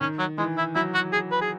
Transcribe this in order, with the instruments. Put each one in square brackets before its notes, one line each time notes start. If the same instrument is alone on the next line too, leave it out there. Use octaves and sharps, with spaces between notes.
[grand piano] D#3 [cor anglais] C#4
[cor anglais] F#3
[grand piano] E3 [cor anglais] G#3
[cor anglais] E4
[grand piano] F#3 [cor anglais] E4
[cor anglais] F#4
G#4
B4
G#4